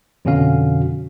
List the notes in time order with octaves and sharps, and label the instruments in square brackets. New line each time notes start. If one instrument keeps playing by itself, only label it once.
[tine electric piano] F2 B2 D3 C#4 F#4 F5